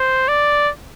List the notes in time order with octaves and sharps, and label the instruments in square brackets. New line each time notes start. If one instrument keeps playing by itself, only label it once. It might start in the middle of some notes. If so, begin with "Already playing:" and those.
Already playing: [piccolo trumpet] C5
D5